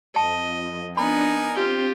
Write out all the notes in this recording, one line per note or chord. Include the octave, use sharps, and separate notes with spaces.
F2 D#5 A5
B3 D4 D#4 A#4 G#5 B5
C4 F4 G4